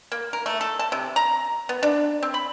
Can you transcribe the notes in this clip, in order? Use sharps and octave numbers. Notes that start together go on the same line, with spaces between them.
A#3
A#4
A3
A4
A5
C3
A#5
B3
D4
C4
B5